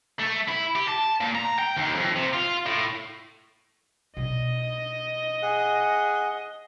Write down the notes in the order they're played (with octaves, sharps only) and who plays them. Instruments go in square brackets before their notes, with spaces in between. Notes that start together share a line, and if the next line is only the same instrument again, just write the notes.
[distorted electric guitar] A3
E4
G4
A5
A#2
A#5
G5
D#2
F2
C3
F4
A2
[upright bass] B2 D4 [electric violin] D#5
[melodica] G#4 F#5